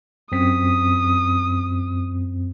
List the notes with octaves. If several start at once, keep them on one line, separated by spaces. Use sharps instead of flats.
F#2 C4 D#6 B6